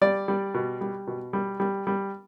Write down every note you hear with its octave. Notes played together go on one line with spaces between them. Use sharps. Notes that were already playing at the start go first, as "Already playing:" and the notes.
G3 D5
G3
B2
G3
B2
G3
G3
G3